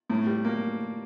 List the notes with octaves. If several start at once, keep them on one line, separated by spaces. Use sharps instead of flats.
A2
G3
A#3